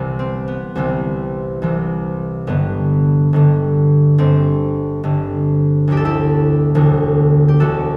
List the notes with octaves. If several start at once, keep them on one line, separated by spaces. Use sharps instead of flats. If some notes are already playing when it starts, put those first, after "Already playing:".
Already playing: C2 C3 E3
C4
B3
C2 C3 E3 C4
C2 C3 E3
G1 G2 D3 B3
G1 G2 D3
G1 G2 D3 C4
G1 G2 D3
E1 D2 D3 G4
A4
E4 G4
E1 D2 D3
G4
E1 D2 D3 F#4 A4